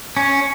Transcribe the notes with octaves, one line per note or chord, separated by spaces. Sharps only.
C#4